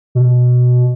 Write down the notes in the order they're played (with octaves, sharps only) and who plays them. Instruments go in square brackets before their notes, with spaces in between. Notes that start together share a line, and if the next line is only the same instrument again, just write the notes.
[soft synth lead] B2